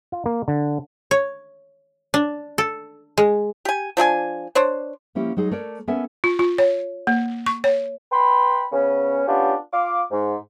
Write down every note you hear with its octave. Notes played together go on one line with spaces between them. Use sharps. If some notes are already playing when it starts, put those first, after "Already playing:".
F4
A#3
D3
C#5
D4
A4
G#3
G4 G#5
F3 D4 A4 G#5
D4 C5 C#5
F3 A#3 C#4 E4 G4
F#3 G#3 D#4 G#4
A3 A#4 C#5 D5
B3 C#4 A4 A#4 E5 G#5
F4
F4
C#5
A#3
C#6
C#5
B4 G5 B5 C6
C#3 B3 C#4
B3 C#4 D4 F4 G4
F4 F5 D6
G#2